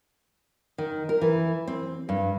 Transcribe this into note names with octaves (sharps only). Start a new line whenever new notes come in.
D#3
A#4
E3
C4
G2